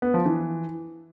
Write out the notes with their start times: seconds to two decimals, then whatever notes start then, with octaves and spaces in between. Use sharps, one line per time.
0.02 B3
0.14 F3
0.26 E3